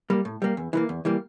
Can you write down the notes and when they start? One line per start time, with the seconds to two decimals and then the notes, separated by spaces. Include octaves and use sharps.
0.10 G3 A#3
0.25 A2
0.42 G3 A#3
0.57 E2
0.73 E3 G3 A#3
0.89 E2
1.05 E3 G3 A#3